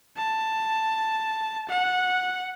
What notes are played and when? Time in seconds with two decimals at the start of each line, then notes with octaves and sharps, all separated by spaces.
0.17 A5
1.69 F#5